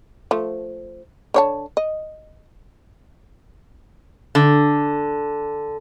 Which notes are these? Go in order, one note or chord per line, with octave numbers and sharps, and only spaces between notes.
F3 A3
D3 C#5 A5
D#5
D3